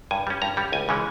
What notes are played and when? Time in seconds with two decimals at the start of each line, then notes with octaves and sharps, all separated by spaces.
0.11 G2 G#5
0.27 G3 C#4
0.42 G2 A#5
0.57 G3 C#4
0.72 C#2 G#5
0.89 C#3 E3 G#3 C#4